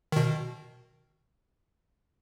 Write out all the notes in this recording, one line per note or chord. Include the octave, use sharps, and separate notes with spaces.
B2 D#3